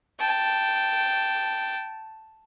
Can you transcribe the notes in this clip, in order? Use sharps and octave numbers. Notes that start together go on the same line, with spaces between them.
G5 A5